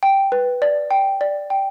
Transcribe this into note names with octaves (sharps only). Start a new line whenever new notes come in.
G5
B4
D5
G5
D5
G5